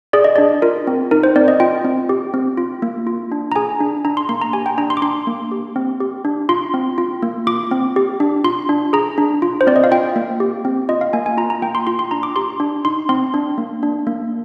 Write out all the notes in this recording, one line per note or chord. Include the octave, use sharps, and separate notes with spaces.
G#4 D5
D#5
D4 D5
F4 A#4
C4
D#4 A#4
C5
C4 D5
D#5
F4 G5
C4
G4
C4
F4
A#3
F4
D4
A#5
G#4 G#5
D4
D4 A#5
C6
A#3 C6
A#5
G4 G#5
G5
D4 A#5
C6
D6
D4 C6
A#3
G4
C4
G4
D4
F4 C6
C4
F4
A#3
F4 D6
C4
G4
D4
F4 C6
D4
G#4 A#5
D4
F4
C5
C4 D5
D#5
F5
F4 G5
A#3
G4
C4
F4 D#5
F5
A#3 G#5
G#5
F4 A#5
A#5
A#3 G5
C6
F4 C6
C6
D4 A#5
D6
G4 C6
D4
D#4 C6
C4 C6
D4
A#3
D4
A#3